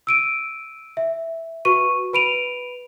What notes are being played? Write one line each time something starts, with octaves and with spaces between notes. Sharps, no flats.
E6 D7 D#7
E5
F#4 B4 C#6 D#7
B4 B5 D7 D#7 F7